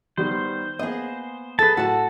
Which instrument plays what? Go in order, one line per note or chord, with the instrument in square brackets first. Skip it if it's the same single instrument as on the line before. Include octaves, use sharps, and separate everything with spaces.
[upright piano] D#3 G3 B3 [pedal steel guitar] C5
[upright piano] A#3 B3 [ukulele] G#4 D#5
[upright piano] G#4 [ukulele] A4 [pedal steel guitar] B4 A5
[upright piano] A2 [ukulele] F#4 A5 [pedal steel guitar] A4